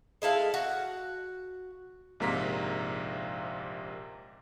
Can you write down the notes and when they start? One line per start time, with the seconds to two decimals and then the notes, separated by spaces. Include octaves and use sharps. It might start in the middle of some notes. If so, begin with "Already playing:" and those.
0.22 G#3 E4 A4 F5
0.54 F#4
2.20 A#1 G#2 C3 A#3 A#5 B6